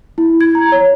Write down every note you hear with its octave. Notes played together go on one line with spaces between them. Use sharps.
E4
G#6
A#5
C#5